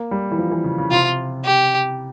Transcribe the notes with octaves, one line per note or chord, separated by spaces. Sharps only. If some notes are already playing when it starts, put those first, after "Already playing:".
Already playing: A#3
G3
E3
F3
E3
C#3
C#3
C3 F4
G4